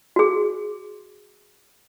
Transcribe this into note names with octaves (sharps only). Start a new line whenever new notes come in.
F#4 G#4